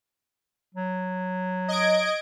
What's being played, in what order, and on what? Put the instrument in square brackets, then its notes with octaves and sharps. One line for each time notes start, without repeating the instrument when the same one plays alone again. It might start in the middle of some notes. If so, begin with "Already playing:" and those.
[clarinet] F#3
[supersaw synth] D#5 G#6 D7